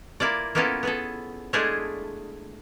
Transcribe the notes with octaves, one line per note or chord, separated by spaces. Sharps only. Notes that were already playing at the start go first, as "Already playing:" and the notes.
A#3 E4 F4 D5
A#3 B3 C#4 E4 F4 A4
B3 G#4 A4
G#3 A3 D4 E4 F4 G#4